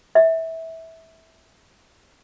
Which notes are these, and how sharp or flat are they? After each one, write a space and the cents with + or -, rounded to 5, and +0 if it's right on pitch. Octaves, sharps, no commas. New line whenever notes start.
E5 -20